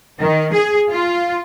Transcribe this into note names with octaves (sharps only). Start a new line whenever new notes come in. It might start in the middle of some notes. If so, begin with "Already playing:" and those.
D#3
G#4
F4